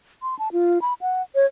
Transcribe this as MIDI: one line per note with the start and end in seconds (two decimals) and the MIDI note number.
0.22 0.37 84
0.39 0.52 81
0.52 0.81 65
0.82 0.94 83
1.01 1.22 78
1.35 1.46 73